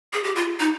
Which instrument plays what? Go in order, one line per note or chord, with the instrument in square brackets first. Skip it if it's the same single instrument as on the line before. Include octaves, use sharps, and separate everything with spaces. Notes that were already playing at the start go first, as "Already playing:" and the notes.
[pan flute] G#4
G4
F4
D#4